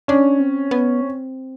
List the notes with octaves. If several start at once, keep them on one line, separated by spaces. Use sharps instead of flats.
C#4 D4
C4
B3
C4